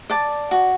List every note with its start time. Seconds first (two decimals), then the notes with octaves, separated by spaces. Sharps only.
0.10 D5 A5
0.51 F#4